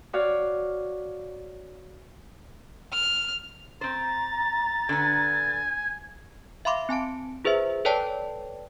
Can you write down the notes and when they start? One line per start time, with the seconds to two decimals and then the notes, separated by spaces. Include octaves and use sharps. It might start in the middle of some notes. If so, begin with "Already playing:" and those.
0.13 F#4 C#5 D5 F5
2.93 F6
3.81 C4 C5 A#5 A6
4.89 D3 B3 G#5
6.65 E5 F5 B5 C6 D6
6.89 C4 G#5 A5 D7
7.45 F4 G#4 B4 C5 E5
7.85 A4 B4 C#5 D5 G5 A5